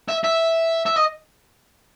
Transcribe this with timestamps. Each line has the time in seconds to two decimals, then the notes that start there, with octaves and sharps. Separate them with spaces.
0.09 E5
0.24 E5
0.86 E5
0.97 D#5